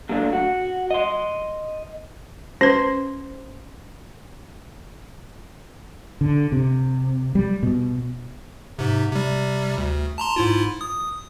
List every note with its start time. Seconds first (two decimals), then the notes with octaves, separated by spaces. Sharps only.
0.09 A#2 F#3 A3 D4
0.33 F#4
0.91 D#5 C6
2.61 C#4 B4 C5
6.21 D3
6.52 C3
7.35 G3
7.63 B2
8.79 G#2 C3
9.12 C3 G3
9.78 D2
10.18 A5 A#5 C6
10.36 G#2 E4 F4
10.81 D#6